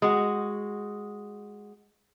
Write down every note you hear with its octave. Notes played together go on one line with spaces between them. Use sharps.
G#3 F#4